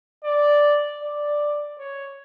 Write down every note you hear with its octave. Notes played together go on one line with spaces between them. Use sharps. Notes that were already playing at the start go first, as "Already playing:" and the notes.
D5
D5
C#5